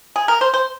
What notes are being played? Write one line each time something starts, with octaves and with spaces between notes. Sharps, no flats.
G#4
A#4
C5
C5